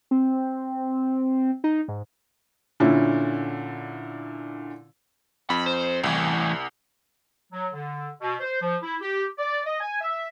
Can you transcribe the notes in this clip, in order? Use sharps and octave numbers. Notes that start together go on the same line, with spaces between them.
C4
D#4
G#2
A#2 D3 C#4 E4
F2 B5
C5
C2 A2 E3
F#3
D3
B2
C5
F3
E4
G4
D5
D#5
G#5
E5